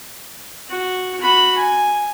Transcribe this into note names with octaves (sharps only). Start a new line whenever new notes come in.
F#4
F#4 B5
G#5